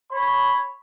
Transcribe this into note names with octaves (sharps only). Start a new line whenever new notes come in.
C#5 B5